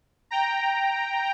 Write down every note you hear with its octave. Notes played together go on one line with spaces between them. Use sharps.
G5 A#5